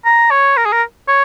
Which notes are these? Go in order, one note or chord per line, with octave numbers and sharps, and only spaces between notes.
A#5
C#5
A#4
G#4
A#4
C#5